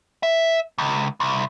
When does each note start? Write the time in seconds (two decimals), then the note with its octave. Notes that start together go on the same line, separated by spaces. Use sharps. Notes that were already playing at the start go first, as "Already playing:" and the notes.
0.23 E5
0.78 C#2
1.20 C2